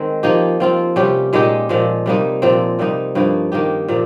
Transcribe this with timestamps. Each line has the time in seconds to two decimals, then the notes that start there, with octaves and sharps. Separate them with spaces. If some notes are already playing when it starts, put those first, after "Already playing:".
Already playing: D#3 G#3 C4
0.23 F3 A#3 D#4 G4
0.60 F3 C4 F4
0.96 C3 G3 C#4 G4
1.33 A#2 G#3 D#4 G4
1.69 A#2 F3 G#3
2.06 C3 G3 A#3 D#4
2.42 A#2 F3 C4
2.79 C3 G3 A#3 D#4
3.15 G2 F3 A#3 D#4
3.52 D#3 A#3 D#4 G4
3.88 A#2 F3 A#3